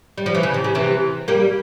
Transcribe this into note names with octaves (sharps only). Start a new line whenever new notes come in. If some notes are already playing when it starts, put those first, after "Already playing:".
G3
F3
E3
C#3
C3
C#3
C3 E3
G3 A#3